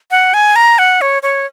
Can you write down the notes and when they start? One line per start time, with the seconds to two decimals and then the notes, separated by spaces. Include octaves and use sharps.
0.11 F#5
0.34 G#5
0.56 A#5
0.79 F#5
1.01 C#5
1.23 C#5